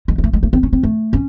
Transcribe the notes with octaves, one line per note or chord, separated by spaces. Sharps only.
G#3
G#3
A3
G#3
A3
C4
C#4
C4
A3
C#4